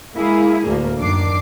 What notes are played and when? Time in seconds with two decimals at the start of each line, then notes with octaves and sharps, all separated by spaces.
0.16 G#3 A#3 E4 G#4
0.64 D2 A2 A#3
0.98 F#2 D#3 D4 D6 C7